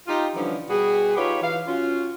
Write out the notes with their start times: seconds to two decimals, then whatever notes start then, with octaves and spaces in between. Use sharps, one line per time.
0.07 D#4 F4 G4
0.36 D3 E3 F3 G3 C#4 D4
0.70 B2 G3 F#4 G#4
1.17 D#4 F4 G4 B4 C#5
1.42 E3 F5
1.67 C#4 F4 F#4